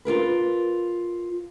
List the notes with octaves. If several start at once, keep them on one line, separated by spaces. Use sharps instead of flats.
F4 G#4 A#4 B4